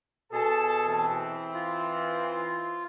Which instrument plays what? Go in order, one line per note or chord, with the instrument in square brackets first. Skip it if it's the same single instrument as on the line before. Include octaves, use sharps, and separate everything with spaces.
[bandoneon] B2 G#4 [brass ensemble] A4 A5
[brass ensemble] E3 C4
[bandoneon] F4